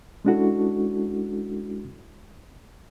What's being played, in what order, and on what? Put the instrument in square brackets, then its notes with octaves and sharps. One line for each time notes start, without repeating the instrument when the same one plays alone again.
[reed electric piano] G#3 C#4 D4 E4 F#4 A4